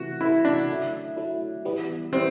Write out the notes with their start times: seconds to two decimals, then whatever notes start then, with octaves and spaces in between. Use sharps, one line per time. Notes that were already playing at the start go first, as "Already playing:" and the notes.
Already playing: C3 E3 A3 F#4
0.21 C3 E3 A3 E4
0.45 D4
0.69 F#3 A3 E4
1.16 F#3 A3 E4
1.65 E3 G3 B3
2.12 E3 G3 B3 C4